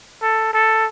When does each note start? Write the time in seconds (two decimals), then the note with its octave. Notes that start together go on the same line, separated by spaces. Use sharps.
0.22 A4
0.53 A4